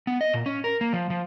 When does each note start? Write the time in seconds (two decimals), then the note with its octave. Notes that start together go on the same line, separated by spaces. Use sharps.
0.07 B3
0.21 D#5
0.34 A#2
0.46 C#4
0.64 A#4
0.81 A#3
0.93 F3
1.10 F3